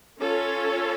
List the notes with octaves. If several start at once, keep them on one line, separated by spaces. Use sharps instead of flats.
C#4 F4 A4 C#5